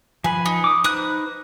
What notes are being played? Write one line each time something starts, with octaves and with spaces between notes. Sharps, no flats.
F3 B4 G#5 B5
D#4
D6 D#6
D#4 B4 C5 D#6 F#6